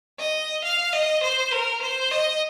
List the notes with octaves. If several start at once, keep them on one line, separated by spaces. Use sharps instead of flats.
D#5
F5
D#5
C5
A#4
C5
D#5